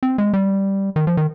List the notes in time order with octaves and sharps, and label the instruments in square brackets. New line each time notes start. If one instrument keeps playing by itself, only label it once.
[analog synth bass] C4
G#3
G3
D#3
F3
D#3